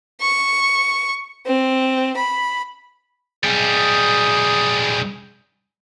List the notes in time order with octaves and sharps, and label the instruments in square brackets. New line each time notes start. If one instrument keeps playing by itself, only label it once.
[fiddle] C#6
C4
B5
[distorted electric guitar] B1 G3 [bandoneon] G#4 D#6 G6